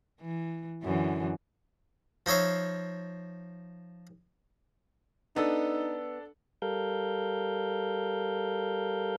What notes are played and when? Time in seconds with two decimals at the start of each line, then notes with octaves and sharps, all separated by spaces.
0.20 E3
0.83 F#2 D3 E3
2.26 F3 D#4 C#5 E5 F5
5.36 B3 D4 D#4 A4
6.62 G3 A4 A#4 F5 G6